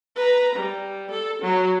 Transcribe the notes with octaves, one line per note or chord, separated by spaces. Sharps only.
B4 A#5
G3
A4
F#3